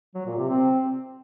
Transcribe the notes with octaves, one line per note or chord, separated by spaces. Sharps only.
F#3
A#2
C3
C4